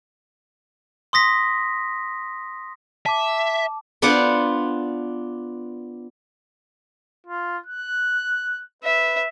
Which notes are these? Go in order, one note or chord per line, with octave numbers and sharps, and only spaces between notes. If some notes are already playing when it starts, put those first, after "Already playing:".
C6 D#6 A#6 B6
E5 A5 D6
B3 D4 F4 C5 D5 F#5
F4
F#6
B4 E5